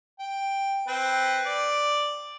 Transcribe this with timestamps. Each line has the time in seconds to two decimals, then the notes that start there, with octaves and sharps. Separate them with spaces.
0.19 G5
0.88 C4 B4
1.46 D5